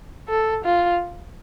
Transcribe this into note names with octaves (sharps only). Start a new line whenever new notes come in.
A4
F4